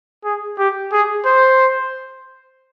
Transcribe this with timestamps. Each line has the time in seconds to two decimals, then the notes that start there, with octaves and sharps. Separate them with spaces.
0.24 G#4
0.58 G4
0.92 G#4
1.25 C5